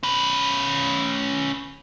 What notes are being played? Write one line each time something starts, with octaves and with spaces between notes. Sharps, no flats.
C#4 B4